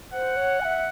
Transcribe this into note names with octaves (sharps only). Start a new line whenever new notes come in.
C5 F#5
C#5
G#5
E5